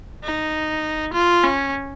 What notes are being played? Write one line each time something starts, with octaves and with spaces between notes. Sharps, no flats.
D#4
F4
C#4